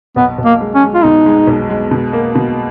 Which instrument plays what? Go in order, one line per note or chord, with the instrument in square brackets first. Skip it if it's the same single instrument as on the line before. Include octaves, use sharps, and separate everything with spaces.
[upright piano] B1 [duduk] B3
[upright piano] B1
[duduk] A#3
[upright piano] G#3
[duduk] C#4
[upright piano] G#3
[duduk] F4
[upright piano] B2 [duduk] D#4
[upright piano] G#3
B1
G#3
B2
A#3
B2